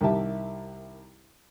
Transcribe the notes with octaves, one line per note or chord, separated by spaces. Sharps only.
C2 D#3 G4 E5 A5